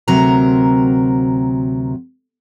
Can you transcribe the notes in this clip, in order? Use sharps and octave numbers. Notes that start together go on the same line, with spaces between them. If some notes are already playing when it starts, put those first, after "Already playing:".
D2 C3 F#3 C4 A#4 A#5